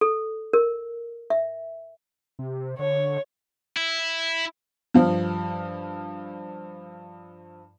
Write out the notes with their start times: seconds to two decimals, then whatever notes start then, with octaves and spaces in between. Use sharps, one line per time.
0.01 A4
0.53 A#4
1.30 E5
2.39 C3
2.79 D3 C#5
3.77 E4
4.94 G2 F3